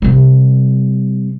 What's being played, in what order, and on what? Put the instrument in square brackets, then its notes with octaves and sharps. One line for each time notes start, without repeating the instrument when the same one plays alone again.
[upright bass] C3 G3